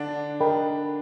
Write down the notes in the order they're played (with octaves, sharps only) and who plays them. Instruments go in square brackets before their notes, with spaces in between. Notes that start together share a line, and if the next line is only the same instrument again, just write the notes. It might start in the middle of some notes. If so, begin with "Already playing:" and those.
Already playing: [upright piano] D3 D4
[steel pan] A#4 D#5 G5 B5